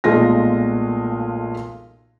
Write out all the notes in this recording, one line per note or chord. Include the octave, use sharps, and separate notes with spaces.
B1 A#2 G#3 A3 F4 A#6